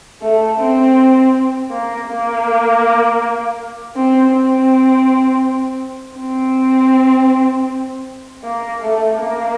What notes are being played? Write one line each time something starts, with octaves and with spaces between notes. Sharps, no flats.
A3
C4
A#3
A#3
C4
C4
C4
A#3
A3
A#3